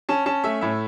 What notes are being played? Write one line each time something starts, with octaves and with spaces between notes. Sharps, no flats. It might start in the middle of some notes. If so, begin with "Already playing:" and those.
C#4 A5
C#4 A5
A3 E5
A2 E5